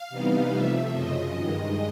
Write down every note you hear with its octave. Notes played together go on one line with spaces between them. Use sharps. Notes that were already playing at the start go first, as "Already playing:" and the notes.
Already playing: F5
C3 E3 G3 B3 D#4
C3 F3 A3 E5
F#2 C#3 F3 D#5
G2 D#3 G#3